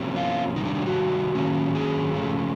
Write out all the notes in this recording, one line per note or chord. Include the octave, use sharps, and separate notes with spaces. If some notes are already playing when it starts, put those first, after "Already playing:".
Already playing: C3 F3 A#3 C#4
F4
C3 D#3 G3 D#4
D4
D4
F4
F#4
D#3 F#3 A#3 C#4
G#4
C#3 F3 A3